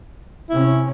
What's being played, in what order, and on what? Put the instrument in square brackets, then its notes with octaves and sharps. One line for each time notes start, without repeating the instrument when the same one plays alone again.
[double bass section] C3 C#4 [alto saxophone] E4